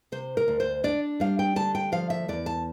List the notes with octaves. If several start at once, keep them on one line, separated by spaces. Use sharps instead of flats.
C3 C5
A#4
D2
C5
D4 D5
G3 F5
G5
D3 A5
G5
F3 F5
E5
E2 D5
A5